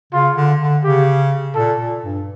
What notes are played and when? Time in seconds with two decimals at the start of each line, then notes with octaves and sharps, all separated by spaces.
0.13 C#3 F4
0.36 D3
0.60 D3
0.84 C#3 G4
1.55 A#2 A4
1.80 A#2
2.03 G2